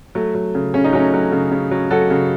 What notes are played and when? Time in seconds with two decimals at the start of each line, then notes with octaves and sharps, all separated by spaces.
0.15 F#3 A3
0.35 F#3
0.55 C#3
0.74 C#3 C#4
0.84 D#4
0.93 F#3 A3 C#4
1.14 F#3
1.32 C#3
1.52 C#3
1.71 F#3
1.91 F#3 F#4 A4
2.10 C#3